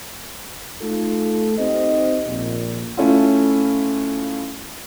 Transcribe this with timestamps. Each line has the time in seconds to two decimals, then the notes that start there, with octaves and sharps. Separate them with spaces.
0.82 A3 D#4 F4 A4
1.58 C4 D#4 G4 C5 D#5
2.28 A#1 A#2
2.97 A3 C#4 E4 F4